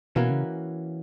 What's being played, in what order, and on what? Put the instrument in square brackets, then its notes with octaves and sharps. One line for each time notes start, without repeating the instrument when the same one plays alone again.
[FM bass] B2 [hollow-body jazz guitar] E3 A#3 C#4 F#4 A#4
[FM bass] C#3